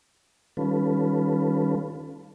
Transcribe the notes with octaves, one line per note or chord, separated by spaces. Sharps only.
D#3 G3 C#4 F4 A4 B4